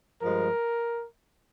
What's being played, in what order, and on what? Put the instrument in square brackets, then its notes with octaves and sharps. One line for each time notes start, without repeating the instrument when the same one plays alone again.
[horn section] G2 F3 G#3 A#4